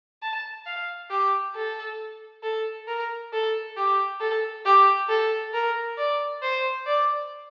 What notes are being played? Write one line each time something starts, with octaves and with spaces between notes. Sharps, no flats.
A5
F5
G4
A4
A4
A#4
A4
G4
A4
G4
A4
A#4
D5
C5
D5